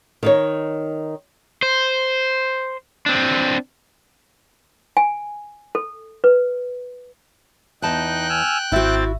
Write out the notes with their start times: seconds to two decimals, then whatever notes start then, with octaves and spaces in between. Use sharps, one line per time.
0.23 D#3 D#4 C#5
1.63 C5
3.06 C4 D4
4.97 G#5
5.75 A4
6.24 B4
7.82 E2 D#4 G5 A5 F#6
8.29 G#5 E6 F6
8.72 G#1 C4 E4 F#4 E5 A6